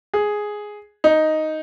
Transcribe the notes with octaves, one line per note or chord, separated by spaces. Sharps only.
G#4
D#4